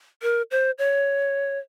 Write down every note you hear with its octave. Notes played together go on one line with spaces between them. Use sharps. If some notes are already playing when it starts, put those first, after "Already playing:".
A#4
C5
C#5